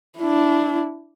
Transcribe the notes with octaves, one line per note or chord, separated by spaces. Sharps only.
D4 E4